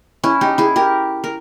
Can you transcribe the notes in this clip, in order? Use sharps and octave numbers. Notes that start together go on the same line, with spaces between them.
C#4 E4
D#4 G4
E4 G#4
G4 A#4
A#4